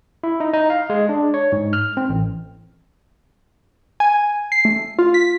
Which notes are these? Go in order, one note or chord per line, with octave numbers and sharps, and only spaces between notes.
E4
D#4
D#4
F5
G#3
D4
C#5
G#2
F6
C4
A1
G#5
C7
A3
F4
B6